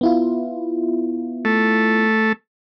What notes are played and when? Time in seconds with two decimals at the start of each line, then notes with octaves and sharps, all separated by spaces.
0.01 B3 E4 F4
1.45 A3